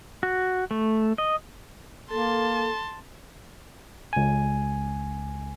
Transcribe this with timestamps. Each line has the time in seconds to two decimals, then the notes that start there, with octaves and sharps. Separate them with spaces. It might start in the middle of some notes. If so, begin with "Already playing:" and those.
0.23 F#4
0.71 A3
1.18 D#5
2.11 A#3 A4 A5 C6
4.13 C#2 G#5